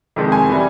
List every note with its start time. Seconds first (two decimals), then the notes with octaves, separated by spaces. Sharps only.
0.16 F2 C3 D#3 G#3
0.32 G#5
0.49 E3 G3